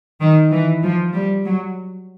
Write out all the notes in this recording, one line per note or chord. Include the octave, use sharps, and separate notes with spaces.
D#3
E3
F3
G3
F#3